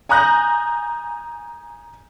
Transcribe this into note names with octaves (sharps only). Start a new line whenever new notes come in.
G#5 A#5 D#6 F#6 G6 A#6